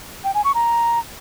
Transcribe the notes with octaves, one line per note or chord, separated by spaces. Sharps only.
G5
G#5
C#6
A#5